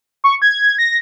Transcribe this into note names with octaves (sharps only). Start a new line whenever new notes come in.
C#6
G#6
A#6